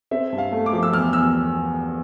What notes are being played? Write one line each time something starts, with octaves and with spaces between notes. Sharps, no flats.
C4 E5
G2
F5
A3
D6
F3
E6
E2 F6
E2 E6